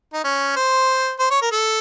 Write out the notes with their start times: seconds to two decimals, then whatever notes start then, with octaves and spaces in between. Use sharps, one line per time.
0.13 D#4
0.24 C#4
0.56 C5
1.19 C5
1.31 C#5
1.42 A#4
1.52 A4